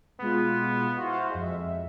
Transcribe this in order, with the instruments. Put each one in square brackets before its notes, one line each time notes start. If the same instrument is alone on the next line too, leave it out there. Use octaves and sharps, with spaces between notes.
[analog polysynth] B2 G#3 F4 [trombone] B3
[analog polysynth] E4 C5 F5 [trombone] F#4
[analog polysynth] F2 E5 [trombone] G#3